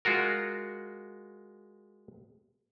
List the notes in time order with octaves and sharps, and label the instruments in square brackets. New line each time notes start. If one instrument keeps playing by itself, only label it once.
[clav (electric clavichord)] G#3 F4 F#4 A#4